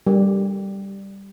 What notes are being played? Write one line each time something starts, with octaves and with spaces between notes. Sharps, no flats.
G3